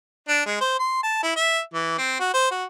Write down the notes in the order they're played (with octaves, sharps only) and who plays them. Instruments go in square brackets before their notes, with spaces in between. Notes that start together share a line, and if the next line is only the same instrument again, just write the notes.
[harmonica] D4
G#3
C5
C6
A5
E4
E5
E3
C4
F#4
C5
F#4